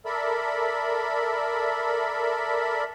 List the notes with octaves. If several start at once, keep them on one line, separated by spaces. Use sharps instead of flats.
A4 A#4 D5 E5 B5